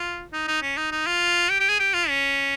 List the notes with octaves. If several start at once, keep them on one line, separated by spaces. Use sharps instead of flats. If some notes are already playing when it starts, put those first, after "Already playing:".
Already playing: F4
D#4
D#4
C#4
D#4
D#4
F4
G4
G4
G#4
G4
F4
C#4